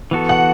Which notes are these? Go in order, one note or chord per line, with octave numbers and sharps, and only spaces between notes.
E3 B3 F#4 A4
F#5